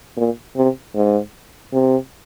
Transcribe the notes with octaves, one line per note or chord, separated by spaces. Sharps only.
A#2
C3
G#2
C3